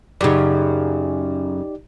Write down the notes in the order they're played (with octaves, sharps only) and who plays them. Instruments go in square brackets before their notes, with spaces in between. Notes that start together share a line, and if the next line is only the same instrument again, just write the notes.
[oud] F#2 C#3 [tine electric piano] D#4 G4 D5